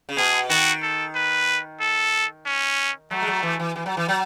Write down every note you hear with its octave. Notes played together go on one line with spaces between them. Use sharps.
C#3
B2 G#4
D#3 F#4
A4
B4
A4
C#4
F#3 A3
G#3
F#3
E3
E3
E3
F#3
E3
F#3